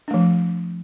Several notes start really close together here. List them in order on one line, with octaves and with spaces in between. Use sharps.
D4 A3 F3